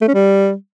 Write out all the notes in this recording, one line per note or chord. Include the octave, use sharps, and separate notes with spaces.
A3
C#4
G3